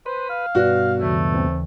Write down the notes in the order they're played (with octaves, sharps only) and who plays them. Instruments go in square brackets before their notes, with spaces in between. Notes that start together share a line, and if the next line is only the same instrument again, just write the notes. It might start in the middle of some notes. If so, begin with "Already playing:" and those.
[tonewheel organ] B4 [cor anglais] C5
[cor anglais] F5
[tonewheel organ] G2 B2 [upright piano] F#4 [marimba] B4 D5 F#6
[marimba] D#2 C#3 E3 [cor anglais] A3
[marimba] D#2 [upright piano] C4